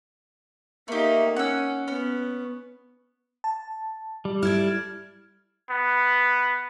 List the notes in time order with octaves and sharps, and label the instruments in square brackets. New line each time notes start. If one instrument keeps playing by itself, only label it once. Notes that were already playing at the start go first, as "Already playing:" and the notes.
[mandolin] A3 G4 [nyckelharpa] A#3 D#4
[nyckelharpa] C#4 [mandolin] F#5 E6
[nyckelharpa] B3 [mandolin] C#4
[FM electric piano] A5
[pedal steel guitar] G3
[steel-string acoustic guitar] E4 A4 D5 [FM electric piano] F6 G#6
[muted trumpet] B3